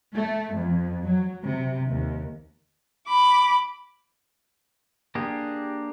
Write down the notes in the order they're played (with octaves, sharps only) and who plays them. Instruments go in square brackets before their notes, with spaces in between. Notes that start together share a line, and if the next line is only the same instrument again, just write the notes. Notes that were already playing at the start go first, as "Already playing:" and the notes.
[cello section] A3
F2
F#3
C3
D#2
[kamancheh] B5 D6
[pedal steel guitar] A#3 D4 G4 G#4